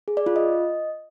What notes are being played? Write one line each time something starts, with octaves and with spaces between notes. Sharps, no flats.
G#4
D5
F4
D#5